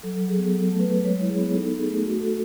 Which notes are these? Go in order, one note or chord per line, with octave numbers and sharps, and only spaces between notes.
F#3 A4
F#3
G#4
B3
F#3 A4
A3
B4
F#3
G#3 C#5
E4
G#4
B3
D#4 A4
D#4
G#4
A3
F#4
F#4 A4